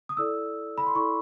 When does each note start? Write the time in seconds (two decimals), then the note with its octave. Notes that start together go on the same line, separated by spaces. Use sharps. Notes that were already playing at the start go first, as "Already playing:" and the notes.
0.09 D#6
0.17 E4 A4 D5 E6
0.78 B5
0.86 C6
0.95 E4 A4 D5 C#6